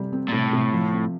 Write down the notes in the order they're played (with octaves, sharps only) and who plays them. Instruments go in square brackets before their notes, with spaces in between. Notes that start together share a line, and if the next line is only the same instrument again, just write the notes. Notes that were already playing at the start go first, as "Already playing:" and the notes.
Already playing: [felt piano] C3 G3
C4
[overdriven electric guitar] A#2
[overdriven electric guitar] A2 [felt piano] C3
[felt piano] C3
F3
C4